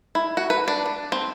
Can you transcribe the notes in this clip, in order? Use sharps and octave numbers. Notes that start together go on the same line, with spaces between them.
E4
F#4
B4
D4
D4
C4